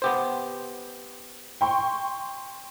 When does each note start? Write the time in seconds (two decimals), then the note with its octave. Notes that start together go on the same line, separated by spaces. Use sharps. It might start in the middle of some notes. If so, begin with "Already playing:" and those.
0.02 B3 G4 C5
1.61 G5 C6 C#6